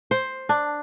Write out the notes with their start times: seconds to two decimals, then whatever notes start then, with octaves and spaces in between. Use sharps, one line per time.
0.11 C5
0.49 D4